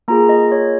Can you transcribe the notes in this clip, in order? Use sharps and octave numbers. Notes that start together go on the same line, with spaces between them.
A#3 F4 G#4 A#5
D#5
C#5